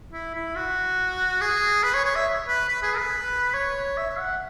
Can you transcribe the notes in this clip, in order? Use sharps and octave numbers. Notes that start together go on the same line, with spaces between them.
E4
E4
F#4
G#4
B4
C#5
C#5
E5
B4
B4
G#4
B4
C#5
E5
E5
F#5